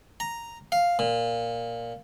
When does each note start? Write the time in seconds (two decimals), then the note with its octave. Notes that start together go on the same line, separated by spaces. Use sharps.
0.20 A#5
0.72 F5
0.99 A#2